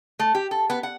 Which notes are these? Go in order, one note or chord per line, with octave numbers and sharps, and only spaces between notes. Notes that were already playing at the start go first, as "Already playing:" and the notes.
A3
G4
A4
B3
F#5